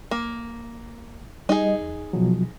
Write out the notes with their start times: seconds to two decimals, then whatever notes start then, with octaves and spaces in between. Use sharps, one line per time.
0.11 A#3
1.49 G3 D#4 G#4 D#5
1.81 E2
2.13 B2 F3 F#3